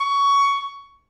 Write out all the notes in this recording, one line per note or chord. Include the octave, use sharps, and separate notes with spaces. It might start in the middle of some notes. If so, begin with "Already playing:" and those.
C#6